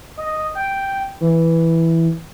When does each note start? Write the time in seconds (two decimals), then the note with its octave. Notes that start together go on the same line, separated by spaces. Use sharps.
0.17 D#5
0.55 G5
1.21 E3